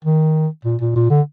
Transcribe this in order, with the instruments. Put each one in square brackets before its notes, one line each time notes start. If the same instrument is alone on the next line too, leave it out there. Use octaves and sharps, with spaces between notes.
[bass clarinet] D#3
A#2
A#2
A#2
D3